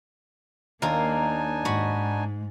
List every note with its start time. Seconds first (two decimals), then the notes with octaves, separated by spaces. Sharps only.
0.82 D#2 A#3 D4 D#4 F4 A#4 G#5
1.65 G#2 F#4 B5